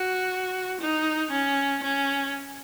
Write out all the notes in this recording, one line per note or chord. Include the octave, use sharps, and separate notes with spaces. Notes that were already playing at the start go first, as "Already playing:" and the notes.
Already playing: F#4
D#4
C#4
C#4